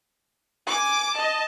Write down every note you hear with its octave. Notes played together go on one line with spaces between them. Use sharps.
G#5 D6
D#5 A5